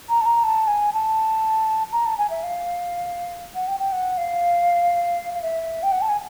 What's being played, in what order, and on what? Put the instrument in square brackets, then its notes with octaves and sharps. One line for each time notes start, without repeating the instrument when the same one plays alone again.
[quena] A#5
A5
A#5
A5
G#5
A5
A#5
A5
G#5
E5
F5
F#5
G5
G5
F#5
F5
F5
E5
G5
F#5
A5
G#5